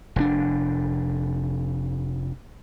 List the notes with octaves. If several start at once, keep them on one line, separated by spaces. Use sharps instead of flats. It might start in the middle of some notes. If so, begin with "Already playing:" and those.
F1 A2 D4